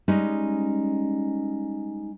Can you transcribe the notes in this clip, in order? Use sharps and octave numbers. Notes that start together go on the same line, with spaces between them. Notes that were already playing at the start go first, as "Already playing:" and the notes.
G3 G#3 C#4 D#4